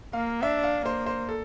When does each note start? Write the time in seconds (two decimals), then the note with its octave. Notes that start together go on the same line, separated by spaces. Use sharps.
0.13 A#3 F5
0.43 D4 E5
0.64 F5
0.86 A#3 C5
1.06 C5
1.29 A4